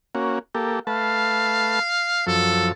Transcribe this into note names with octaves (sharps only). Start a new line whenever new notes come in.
A#3 C#4 F#4
A#3 G4 A4
A3 B4 F5 A5
F#2 F3 A4